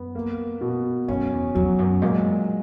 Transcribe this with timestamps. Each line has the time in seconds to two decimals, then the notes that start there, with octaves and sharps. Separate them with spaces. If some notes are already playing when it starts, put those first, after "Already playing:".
Already playing: F#2 B3
0.15 A#3
0.61 B2
1.08 F#2 C#4
1.32 E2
1.55 E2 F#3
1.79 F#2
2.02 A#2 G#3